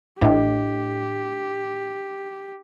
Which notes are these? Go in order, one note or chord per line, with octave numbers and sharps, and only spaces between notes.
A1 A2 D4 G4 D#5 G5